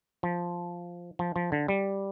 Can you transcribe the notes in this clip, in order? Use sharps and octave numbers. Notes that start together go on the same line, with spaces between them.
F3
F3
F3
D3
G3